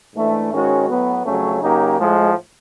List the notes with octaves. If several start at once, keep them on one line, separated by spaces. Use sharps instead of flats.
G#2 E3 A3 D4
G#2 D#3 G#3 C#4 F#4
A2 F#3 B3
F2 C#3 F#3 A3 C#4
C#3 F#3 A#3 D#4 G4
A2 F3 G#3